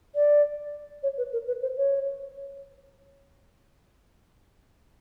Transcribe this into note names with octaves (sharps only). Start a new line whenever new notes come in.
D5
C#5
B4
A#4
B4
C5
C#5